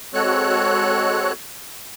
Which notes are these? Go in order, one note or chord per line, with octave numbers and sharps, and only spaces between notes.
G#3 C4 F#4 A4 C#5 F#6